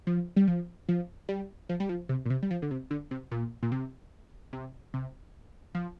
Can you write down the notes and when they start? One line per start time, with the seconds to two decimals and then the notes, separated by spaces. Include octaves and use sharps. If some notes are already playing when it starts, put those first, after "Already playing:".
0.07 F3
0.36 G3
0.48 F3
0.89 F3
1.29 G3
1.69 F3
1.80 G3
1.89 F3
2.09 C3
2.26 A#2
2.30 C3
2.43 G3
2.51 F3
2.62 D3
2.71 C3
2.91 D3
3.11 C3
3.31 A#2
3.63 A#2
3.72 C3
4.53 C3
4.94 C3
5.75 F3